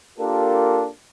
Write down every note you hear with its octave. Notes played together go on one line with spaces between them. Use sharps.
A#3 D4 F4 G4 A4 A#4